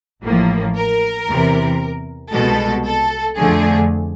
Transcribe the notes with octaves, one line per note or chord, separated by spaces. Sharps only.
A1 A2 F3 A#3
A#4
E2 C3 E3
C2 B2 G#3 A4
A4
F2 D3 F3 A3 G#4